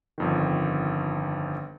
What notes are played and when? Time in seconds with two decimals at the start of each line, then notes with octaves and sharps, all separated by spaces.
0.18 G1 F2 D#3